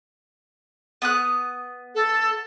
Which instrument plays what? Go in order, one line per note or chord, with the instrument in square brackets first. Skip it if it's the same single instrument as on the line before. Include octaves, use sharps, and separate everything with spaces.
[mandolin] B3 D#6 F#6
[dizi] A4